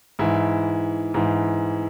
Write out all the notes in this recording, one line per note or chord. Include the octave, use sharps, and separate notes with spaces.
G#2 E3 E4
G#2 E3